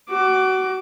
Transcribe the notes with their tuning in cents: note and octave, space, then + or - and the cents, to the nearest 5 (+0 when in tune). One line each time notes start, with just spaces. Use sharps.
F#4 +25 D6 +0